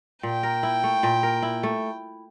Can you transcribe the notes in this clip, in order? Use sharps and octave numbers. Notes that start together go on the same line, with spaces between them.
A#2 G5
A#4
E4
A3
A#2
A#4
E4
A3